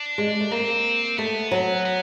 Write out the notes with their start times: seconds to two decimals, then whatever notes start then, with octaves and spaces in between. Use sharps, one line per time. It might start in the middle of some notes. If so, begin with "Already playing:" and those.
Already playing: D4
0.18 G#3
0.40 A3
0.51 A#3 C4
1.18 A3 B3
1.51 F#3
1.85 B3